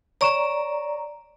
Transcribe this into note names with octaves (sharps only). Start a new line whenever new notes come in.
C#5 D5 A#5 C#6 E7